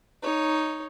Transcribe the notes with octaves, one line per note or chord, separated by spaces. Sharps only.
D#4 C#5